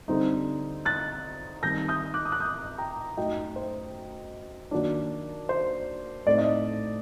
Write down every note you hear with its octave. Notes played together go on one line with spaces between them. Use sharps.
D3 G3 C4 D#4
F#6 A6
D#3 G3 C4 D#4 G6 A#6
D#6 G6
D6 F#6
D#6
F#6
D#6 G6
G5 A#5
F#2 F#3 A3 D#4 D#5 G5
C5
D#3 F#3 A#3 D4
C5
A2 A3 C4 D#4 D5
D#5